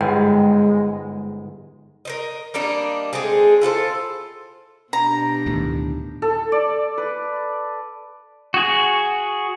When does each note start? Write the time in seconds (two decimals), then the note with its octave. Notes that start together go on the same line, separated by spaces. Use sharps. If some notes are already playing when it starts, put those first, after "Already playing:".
0.01 G1 G#2 G#3 G5
2.05 A#4 C5 D#5
2.54 G3 A#3 D4 D#4
3.13 G#3 A3 C4 G#4
3.61 E4 F4 A4 C5
4.93 B2 D4 G4 A#5
5.46 D2 A2 D#3
6.22 A4
6.52 D5
6.98 B4
8.54 F#4 G#4